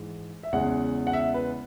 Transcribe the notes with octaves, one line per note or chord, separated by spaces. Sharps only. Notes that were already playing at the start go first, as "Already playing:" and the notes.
Already playing: G#2 E3 G#3
E5
E2 C#3 G#3 F#5
F#5
E5
B4